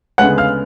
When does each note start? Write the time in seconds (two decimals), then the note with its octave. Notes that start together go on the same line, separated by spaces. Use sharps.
0.18 D2 C#3 G#3 B3 F#5 F#6
0.38 F5 F6